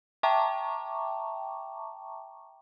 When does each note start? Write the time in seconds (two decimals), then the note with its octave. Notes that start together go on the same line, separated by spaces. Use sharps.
0.23 E5 G5 A5 A#5 C#6 D6